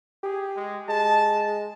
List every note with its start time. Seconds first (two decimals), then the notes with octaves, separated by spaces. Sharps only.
0.23 G4 G#4
0.56 G#3
0.89 G#3 A5